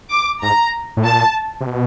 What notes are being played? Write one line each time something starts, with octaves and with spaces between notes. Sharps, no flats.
D6
G#2 A#5
A2
A#2 A5
C3
B2